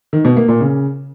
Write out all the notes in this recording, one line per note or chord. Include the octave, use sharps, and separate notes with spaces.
D#3
B2
A#3
A#2
C#3